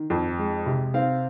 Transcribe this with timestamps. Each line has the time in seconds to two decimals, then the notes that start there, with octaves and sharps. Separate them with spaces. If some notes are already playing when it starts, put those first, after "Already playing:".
Already playing: D#3
0.10 F2
0.38 G#3
0.66 C3
0.94 C4 F5